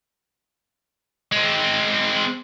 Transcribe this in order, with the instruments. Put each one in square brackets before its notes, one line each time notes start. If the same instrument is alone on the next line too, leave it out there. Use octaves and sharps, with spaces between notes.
[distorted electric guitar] G#3 C4